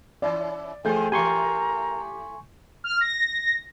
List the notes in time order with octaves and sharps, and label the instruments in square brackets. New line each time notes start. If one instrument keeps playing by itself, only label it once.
[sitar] E3 C#4 E4 [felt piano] D5
[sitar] D3 E3 C4 [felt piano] A3 G#4 G6 [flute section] G5 G#5
[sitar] E3 A3 [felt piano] G4 [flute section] A#4 A#5 [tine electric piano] G#5 C6 C#6
[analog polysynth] F6
A#6